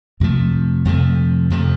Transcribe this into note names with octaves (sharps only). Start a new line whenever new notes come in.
F2 C3 F3 A3
F2 C3 F3 A3
F2 C3 F3 A3